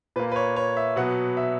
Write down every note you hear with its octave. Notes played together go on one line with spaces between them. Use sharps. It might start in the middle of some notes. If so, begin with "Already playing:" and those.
A#2 A#3 B4
B4
C#5
C#5
E5
B2 F#3 B3 F#5
E5